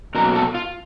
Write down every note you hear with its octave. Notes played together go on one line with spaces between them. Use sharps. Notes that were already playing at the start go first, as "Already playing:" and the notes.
B2 F#3 A#3 A#4
A4
F4